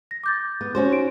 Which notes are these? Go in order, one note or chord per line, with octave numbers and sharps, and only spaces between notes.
A#6
D6 G6 A6
B3
C#4 F#4 C5
D#4 D7